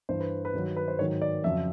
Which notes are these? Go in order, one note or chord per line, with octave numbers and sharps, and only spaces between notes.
G2 E3 C5
B4
B4
G2 D#3 F#3
B4
C5
G#2 D#3 F#3 C#5
D5
F2 C#3 F#3 E5